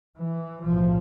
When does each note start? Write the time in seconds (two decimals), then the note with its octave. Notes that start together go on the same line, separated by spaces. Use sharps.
0.18 E3
0.63 B1 A2 F3